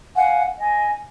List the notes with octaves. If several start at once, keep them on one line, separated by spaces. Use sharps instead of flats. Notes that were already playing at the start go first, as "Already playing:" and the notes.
F5 F#5 G#5
D#5 G#5